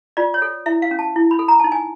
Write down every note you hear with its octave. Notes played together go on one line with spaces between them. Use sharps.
F4 D5
C#5
A4
E4 E5
F5
C#4
A5
E4
B5
A4
A#5
D#4 A5
G#5